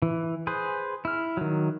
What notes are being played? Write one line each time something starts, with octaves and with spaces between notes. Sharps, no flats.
E3
G#4 B4 C5
E4 F6
D#3 F#3